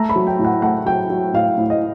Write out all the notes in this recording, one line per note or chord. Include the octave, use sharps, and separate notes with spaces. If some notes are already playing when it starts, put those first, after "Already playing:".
Already playing: A3 A#5
B5
F#3
G5
A2
F#5
A3 F#5
F#3 G5
F#3
A2 F5
A2
D#5